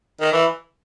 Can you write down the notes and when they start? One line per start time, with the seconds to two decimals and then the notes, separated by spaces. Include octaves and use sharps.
0.21 D#3
0.32 E3